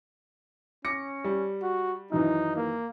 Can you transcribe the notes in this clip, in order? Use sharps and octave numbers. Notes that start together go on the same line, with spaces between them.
C#4 D6 A#6 C#7
G3
F#4
F#2 D#3 E3 D#4
A#3